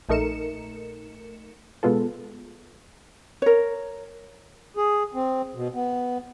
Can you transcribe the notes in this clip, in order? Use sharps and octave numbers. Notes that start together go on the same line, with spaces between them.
A#1 A3 D#4 A#4 C#7 E7
B2 G#3 B3 F4 A4
A#4 C#5
G#4
C4
B2
B3